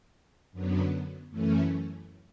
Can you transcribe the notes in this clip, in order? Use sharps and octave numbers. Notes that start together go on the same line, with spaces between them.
F#2 D3 F#3 B3
F#2 E3 A3 C#4